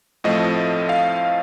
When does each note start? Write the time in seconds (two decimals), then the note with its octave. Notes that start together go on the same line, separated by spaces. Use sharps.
0.24 A2 F3 A3 C4 D#5
0.89 F5